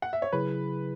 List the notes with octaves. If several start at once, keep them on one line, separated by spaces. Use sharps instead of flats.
F#5
E5
C#5
C#3 F#3 E4 G#4 B4